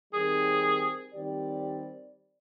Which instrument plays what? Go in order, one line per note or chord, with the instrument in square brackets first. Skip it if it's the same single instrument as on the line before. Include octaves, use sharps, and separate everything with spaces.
[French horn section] D#3 G3 C4 G4 A#4 [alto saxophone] G#4
[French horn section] D#3 G3 C4 G4 D5